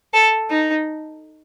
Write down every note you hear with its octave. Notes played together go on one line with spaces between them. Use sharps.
A4
D#4